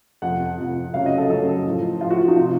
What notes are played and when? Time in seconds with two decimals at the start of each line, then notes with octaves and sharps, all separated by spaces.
0.22 F2 C3 F3 F#5
0.58 F2 C3 F3
0.94 F#2 C#3 F#3 F5
1.06 D#5
1.18 A4
1.30 F#2 C#3 F#3 A4
1.65 A2 F3
2.01 A2 F3 F4
2.10 F#4
2.19 F4
2.28 D#4
2.36 C3 F3 F4